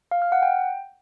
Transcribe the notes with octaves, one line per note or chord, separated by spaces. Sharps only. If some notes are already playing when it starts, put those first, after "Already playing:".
F5
F6
F#5
G5